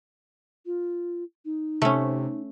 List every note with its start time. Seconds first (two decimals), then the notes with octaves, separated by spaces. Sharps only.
0.66 F4
1.45 D#4
1.82 C3 A3 C#4